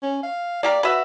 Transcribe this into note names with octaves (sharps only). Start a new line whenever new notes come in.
C#4
F5
A#3 G4 A#4 D5
F#4 B4 E5